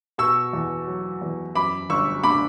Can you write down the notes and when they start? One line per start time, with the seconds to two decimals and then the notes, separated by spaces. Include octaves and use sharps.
0.18 B2 C#6 E6
0.53 E2
0.87 F#3
1.21 E2
1.55 F#2 B5 D6
1.90 G1 C#6 E6
2.23 D3 B5 D6